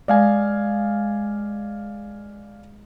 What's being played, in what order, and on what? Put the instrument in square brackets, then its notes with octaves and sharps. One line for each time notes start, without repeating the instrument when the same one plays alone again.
[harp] G#3 [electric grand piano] D5 F5 G#5